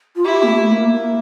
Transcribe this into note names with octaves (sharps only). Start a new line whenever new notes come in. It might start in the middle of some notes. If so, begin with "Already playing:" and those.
F4
E4 G4
A#3
A3
A#3
A#3